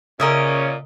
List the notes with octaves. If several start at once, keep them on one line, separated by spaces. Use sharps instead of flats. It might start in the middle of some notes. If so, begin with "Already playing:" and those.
A#2 C#3 C#4 A#4 D#5 E5